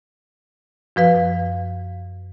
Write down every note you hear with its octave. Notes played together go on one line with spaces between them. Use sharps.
F#2 F3 B4 F5